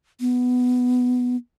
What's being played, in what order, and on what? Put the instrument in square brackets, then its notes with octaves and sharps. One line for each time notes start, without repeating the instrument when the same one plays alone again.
[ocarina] B3